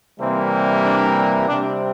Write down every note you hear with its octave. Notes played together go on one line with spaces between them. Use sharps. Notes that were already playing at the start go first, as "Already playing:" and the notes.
C3 E3 G3 A#3 C4
D4
C3 G3 C4 D4